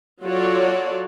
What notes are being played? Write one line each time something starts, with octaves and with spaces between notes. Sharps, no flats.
F#3 F4 F#4 A4 C#5 D5